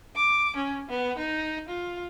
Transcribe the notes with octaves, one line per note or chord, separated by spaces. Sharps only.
D6
C#4
B3
D#4
F4